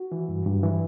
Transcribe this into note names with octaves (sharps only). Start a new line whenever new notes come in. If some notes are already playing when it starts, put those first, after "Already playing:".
Already playing: F#4
E3
G2
G2
E3